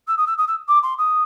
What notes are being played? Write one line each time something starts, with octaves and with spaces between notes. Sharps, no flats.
E6
D#6
E6
D#6
E6
D6
C6
D#6